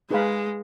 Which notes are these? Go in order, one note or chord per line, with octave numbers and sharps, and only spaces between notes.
G#3 D#4 G#4 B4 F5 B5